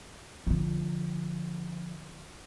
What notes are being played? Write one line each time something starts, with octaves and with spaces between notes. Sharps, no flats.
D3 F3